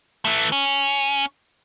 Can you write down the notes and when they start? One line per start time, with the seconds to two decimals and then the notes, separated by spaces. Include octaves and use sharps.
0.25 E3 A3
0.52 C#4